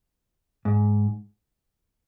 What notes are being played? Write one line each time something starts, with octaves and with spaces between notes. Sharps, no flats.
G#2